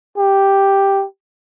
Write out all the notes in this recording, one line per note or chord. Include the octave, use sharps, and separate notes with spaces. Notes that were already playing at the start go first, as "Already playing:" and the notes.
G4